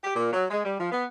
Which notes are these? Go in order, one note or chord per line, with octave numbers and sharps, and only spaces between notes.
G4
A#2
F#3
G#3
G3
F3
B3